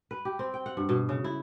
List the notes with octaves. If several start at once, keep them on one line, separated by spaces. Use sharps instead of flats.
B4
G4
C4
G5
F#5
G2
B2
C#3
E4